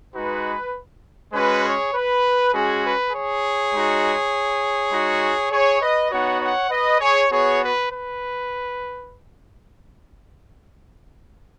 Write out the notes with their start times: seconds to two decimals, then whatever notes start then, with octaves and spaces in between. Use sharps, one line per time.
0.15 G#3 D#4 F#4 B4
1.33 G#3 C#4 F#4 B4
1.64 G#4 C#5
1.94 B4
2.53 G#3 C#4 F#4 G#4
2.83 B4
3.12 G#4 C#5
3.72 G#3 D#4 F#4
4.92 G#3 D#4 F#4
5.51 G#4 C#5
5.81 B4 D#5
6.11 B3 D#4 F#4 C#5 F#5
6.41 C#5 F#5
6.70 B4 D#5
7.00 G#4 C#5
7.30 B3 F#4 G#4 C#5
7.61 B4
7.90 B4